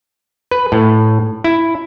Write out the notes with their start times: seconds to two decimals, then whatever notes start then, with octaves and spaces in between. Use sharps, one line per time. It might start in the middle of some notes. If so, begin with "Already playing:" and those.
0.51 B4
0.72 A2
1.44 E4